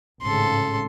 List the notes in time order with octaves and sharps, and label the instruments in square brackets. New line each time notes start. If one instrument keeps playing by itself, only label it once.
[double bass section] G#1 A2 C#3 [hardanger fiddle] A4 C6